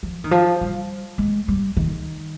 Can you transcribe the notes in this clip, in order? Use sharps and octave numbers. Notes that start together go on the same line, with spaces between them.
F3
D#3
F3
G3
G#3
G3
D#3